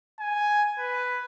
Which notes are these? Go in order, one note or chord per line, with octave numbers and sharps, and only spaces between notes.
G#5
B4